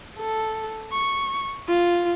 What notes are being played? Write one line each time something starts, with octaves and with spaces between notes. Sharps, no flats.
A4
C#6
F4